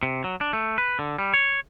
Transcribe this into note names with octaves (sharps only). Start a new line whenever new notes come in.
C3
F#3
D4
A3
B4
D3
G3
C#5